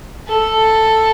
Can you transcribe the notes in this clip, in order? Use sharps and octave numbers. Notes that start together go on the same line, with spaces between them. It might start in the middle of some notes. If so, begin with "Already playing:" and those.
A4